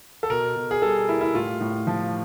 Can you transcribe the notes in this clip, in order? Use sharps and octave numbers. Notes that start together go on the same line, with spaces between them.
A4
B2 A#4
B2
G#4
G3 A4
A#3 E4
E4
A2 F4
A2
F3